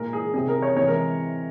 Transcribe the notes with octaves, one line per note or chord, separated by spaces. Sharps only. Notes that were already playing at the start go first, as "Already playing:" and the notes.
Already playing: A#2 G#3 A#4
G#4
C3 G3 G#4
A#4
C#5
C3 E3 G#3 C#5
A#4